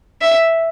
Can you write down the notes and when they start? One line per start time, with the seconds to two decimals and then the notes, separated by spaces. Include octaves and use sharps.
0.21 E5